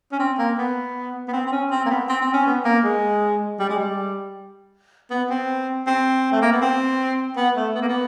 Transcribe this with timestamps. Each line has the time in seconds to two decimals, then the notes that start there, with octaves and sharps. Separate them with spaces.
0.12 C#4
0.19 C4
0.38 A#3
0.58 B3
1.28 B3
1.33 C4
1.47 C4
1.52 C#4
1.71 C4
1.85 A#3
1.90 B3
2.09 C4
2.21 C4
2.34 C#4
2.47 B3
2.65 A#3
2.84 G#3
3.59 G3
3.69 G#3
3.79 G3
5.10 B3
5.30 C4
5.87 C4
6.32 A3
6.42 A#3
6.52 B3
6.61 C4
7.37 B3
7.56 A3
7.75 B3
7.81 A#3
7.88 B3